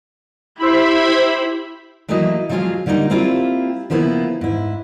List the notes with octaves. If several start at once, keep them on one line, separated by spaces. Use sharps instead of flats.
E4 G4 C5 E5 B5
E3 F#3 A3 A#3 E4 D#5
F3 F#3 G#3 F4 G#4 F5
D3 G3 A#3 C4 D#4
A#3 C4 E4 F4 G4
C#3 F3 A#3 B3 E4
G#2 E4